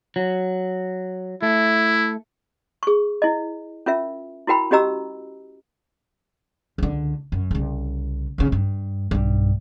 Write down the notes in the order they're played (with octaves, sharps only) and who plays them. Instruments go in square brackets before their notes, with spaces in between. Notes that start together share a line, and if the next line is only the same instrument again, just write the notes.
[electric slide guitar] F#3
[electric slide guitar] A3 [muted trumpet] E4
[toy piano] G#4 C#6
E4 D#5
C#4 F4 A#4 E5
E4 F#4 A#4 G5 B5
C#4 F#4 G4 D#5 A#5 E6
[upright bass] C#2 D3
F#2
C2 C#3
D#2 C#3
G2
B1 G2